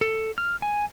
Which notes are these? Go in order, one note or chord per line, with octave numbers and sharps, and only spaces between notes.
A4
F6
G#5